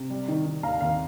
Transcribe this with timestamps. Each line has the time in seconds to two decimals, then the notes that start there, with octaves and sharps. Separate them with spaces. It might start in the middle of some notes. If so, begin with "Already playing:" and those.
Already playing: C3
0.10 G3
0.28 D#3
0.46 D#3
0.63 D#2 F5 A#5
0.81 D#2 F5